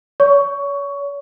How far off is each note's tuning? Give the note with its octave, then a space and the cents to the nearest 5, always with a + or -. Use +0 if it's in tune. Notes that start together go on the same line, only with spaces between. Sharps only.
C#5 +35 C#6 +15